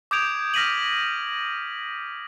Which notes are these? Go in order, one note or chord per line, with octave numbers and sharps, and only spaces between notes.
D6 D#6 G6 G#6 D7 F7
F6 A#6 B6 D#7 F#7